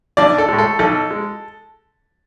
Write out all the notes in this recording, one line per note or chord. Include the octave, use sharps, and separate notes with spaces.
B1 D4 D5
A4
A2 G#3
A4
B1 A4
G#3